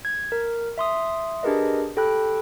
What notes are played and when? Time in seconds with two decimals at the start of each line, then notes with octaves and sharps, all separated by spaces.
0.05 G#6
0.32 A#4
0.78 E5 C6 D#6
1.43 D4 G4 G#4 A#4 B4 D#5
1.96 G4 A4 G5 B5 F#6